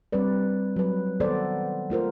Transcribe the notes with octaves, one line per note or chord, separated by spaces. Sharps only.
G3 C4 D4 B4 D5
F#3 B4
D#3 B3 A4 C5 D5
A3 F4 A#4 C5